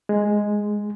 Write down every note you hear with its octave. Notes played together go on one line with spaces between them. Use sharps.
G#3